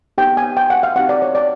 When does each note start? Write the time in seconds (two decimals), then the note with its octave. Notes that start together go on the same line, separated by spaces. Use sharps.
0.18 B3 D#4 G4 G5
0.37 G#5
0.57 G5
0.70 F#5
0.83 F5
0.95 C4 D#4 G4 F#5
1.09 D5
1.22 C#5
1.35 D5